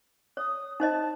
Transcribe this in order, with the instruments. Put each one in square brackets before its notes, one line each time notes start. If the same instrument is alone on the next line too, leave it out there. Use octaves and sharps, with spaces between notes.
[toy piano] C#5 [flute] D#6
[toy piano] D#4 C5 D#5 [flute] A5